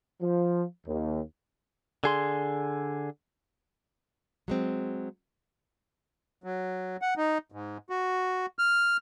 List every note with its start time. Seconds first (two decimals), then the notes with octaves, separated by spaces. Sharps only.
0.22 F3
0.86 D#2
2.04 D3 G#4 C6
4.48 F#3 G#3 C4
6.44 F#3
7.02 F#5
7.17 D#4
7.52 G#2
7.90 F#4
8.59 F6